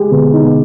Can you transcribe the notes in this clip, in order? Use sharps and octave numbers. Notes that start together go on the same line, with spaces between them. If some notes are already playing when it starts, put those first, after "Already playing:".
Already playing: G#3 G4
B2 D3 B3
D#4
B2